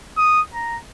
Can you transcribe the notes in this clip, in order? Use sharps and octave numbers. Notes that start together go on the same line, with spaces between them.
D#6
A#5